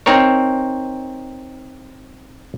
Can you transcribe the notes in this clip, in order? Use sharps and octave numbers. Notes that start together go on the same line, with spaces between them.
C4 D#4 A#4 C#5